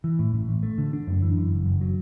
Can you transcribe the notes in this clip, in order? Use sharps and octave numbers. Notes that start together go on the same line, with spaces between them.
E3
A2
A1
A1
A3
D3
D4
F#2
E3
F#2
F#1
F#1
F#3